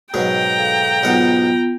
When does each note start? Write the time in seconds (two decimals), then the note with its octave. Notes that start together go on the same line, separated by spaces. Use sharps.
0.14 G#2 B2 F#3 G5 A#5
0.57 A4 F5
1.03 B1 G#2 B3 F4 F#5